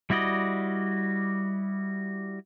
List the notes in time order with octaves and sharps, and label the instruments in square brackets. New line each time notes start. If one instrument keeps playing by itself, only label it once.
[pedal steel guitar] G3 E4 F#4 D5 D#5